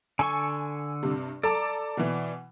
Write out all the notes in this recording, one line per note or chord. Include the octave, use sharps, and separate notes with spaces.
D3 A4 G#5 C#6
G2 C3
A4 D5 A#5 D6
B2 E3